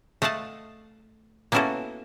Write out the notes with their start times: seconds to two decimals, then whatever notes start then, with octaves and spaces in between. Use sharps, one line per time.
0.22 A3 D#5 F5 F#5 A5
1.52 A#3 B3 C#4 E4 F#4 A4